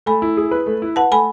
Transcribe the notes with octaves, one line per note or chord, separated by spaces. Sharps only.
A3 G#5 B5
E4
G#4
B4
A3
E4
B4 F#5 A5
A3 G#5 B5